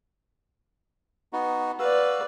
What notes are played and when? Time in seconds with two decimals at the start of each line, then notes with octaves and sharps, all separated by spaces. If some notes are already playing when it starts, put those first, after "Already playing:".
1.33 B3 D#4 F#4
1.79 F#4 B4 D5 F5 E6